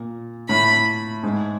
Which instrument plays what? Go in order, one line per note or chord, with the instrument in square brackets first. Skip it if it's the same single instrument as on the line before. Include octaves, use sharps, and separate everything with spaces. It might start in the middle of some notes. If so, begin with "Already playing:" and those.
Already playing: [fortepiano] A#2
[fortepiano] A2 [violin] B5
[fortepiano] G#2